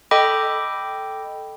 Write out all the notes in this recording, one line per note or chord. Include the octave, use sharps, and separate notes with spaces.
A4 D#5 G5 B5 D6